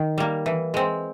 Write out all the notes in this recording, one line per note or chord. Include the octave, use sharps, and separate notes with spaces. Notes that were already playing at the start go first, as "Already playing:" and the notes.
Already playing: D#3
G3 A#3
E3
G#3 C4